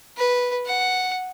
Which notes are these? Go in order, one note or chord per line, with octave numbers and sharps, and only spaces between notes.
B4
F#5